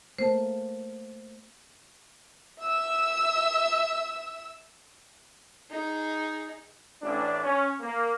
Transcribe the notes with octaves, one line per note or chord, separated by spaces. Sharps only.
A3 A#3 A#4 C5 A5
E5 E6
D#4 G#4
A1 D4
C#4
A#3